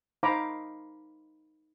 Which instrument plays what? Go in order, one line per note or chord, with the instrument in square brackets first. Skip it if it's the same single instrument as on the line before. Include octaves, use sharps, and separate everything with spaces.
[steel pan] D#4 C5 F5 A#5 B5 D6